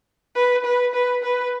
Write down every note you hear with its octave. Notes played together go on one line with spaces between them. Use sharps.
B4
B4
B4
B4